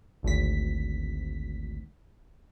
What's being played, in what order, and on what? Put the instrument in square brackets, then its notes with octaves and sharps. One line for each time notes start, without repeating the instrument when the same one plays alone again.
[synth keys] G#1 D2 B6